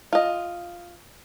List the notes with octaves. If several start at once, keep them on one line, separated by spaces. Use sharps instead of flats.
F4 D#5